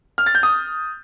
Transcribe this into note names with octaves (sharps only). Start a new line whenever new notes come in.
F6
A6
G6
D#6